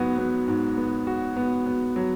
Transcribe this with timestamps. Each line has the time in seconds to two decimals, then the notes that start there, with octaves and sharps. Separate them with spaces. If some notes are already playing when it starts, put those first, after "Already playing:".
Already playing: G#2 F#3 B3 F#4
0.18 B3
0.48 G#2
0.77 B3
1.07 F#4
1.36 B3
1.66 B3
1.96 F#3